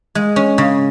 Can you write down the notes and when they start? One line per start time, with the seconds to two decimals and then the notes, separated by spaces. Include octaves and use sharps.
0.15 G#3
0.36 C#4
0.58 C#3